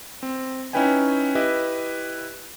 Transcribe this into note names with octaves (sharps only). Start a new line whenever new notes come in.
C4
C#4 D#4 E4 B4 G5 G#5
E4 G4 B4 D#5 E5